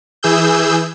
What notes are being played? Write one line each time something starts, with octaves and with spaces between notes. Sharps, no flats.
E3 G#4 E6 G6